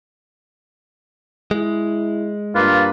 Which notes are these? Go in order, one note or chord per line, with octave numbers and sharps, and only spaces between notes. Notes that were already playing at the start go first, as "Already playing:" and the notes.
G#3 E4
G2 A#3 F4 B4